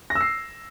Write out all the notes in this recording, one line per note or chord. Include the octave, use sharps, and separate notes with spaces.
A#6
E6
C7